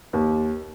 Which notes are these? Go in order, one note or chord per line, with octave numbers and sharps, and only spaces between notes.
D#2